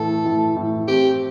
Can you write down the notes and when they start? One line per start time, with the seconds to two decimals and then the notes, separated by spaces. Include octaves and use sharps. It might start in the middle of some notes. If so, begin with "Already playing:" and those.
Already playing: A2 E3 A4
0.25 A2
0.56 A2
0.88 C4 G4